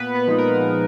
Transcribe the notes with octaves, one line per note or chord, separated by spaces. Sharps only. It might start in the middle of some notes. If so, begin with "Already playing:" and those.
Already playing: A#2 B3 B4
B3 B4
F3 G#3 B3 D#4
A#4
A#2